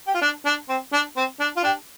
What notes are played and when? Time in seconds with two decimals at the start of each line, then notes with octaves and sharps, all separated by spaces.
0.07 G4
0.14 F4
0.21 D4
0.45 D4
0.69 C4
0.93 D4
1.17 C4
1.40 D4
1.57 F4
1.64 D4 G4